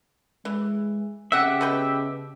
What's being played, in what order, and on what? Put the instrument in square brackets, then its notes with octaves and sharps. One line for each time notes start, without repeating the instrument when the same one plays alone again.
[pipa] E3 [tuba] G#3
[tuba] C#3 [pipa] C4 F#5 [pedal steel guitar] G4 E5
[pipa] B2 B4 G5